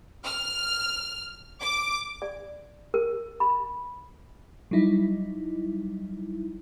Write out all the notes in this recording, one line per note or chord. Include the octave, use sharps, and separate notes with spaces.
F6
D6
D5
A#4
B5
F#3 G3 D#4 E4